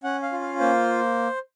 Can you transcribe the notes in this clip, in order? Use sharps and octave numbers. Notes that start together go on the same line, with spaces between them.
C#4 F#5
F5
F4
F5
A#3 C5